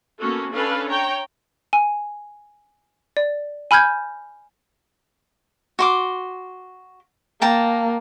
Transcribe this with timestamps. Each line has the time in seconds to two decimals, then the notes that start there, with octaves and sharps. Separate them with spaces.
0.18 A#3 B3 C#4 F#4 A4
0.54 C#4 D4 A4 B4 F5
0.89 C#5 G5 A#5
1.73 G#5
3.17 D5
3.71 G#5 B5 F6 G6 G#6
5.79 F#4 C6 D6
7.42 A#3 G5 A5 A#5